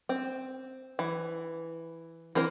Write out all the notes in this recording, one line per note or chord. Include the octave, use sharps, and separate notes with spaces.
C4
E3
E3 C4 A#4 C5